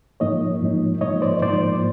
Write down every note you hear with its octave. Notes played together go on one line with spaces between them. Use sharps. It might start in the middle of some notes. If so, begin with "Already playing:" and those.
G#2 F3 A#3 D#4 C#5 D#5
G#2 F3 A#3 D#4
G#2 F3 A#3 D#4 C#5 D#5
C5 D5
G#2 F3 A#3 D#4 C5 D5